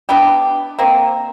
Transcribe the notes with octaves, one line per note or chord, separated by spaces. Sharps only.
B3 D4 E4 G4
A#3 C4